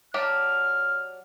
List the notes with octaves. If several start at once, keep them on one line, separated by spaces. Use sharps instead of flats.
F#3 D4 G4 F6